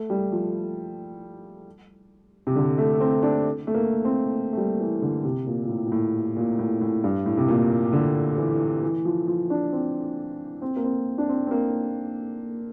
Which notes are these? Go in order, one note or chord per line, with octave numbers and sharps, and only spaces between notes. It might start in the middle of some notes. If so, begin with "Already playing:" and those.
Already playing: A3
G3
F3
C3
D3
A3
C4
D4
A3
A#3
C4
A3
G3
E3
D3
C3
A#2
A#2
A2
A#2
A2
A#2
A2
A2
G2
A2
C3
A#2
D3
E3
E3
F3
F3
D4
C4
C4
A#3
C4
D4
C4
C4
A#3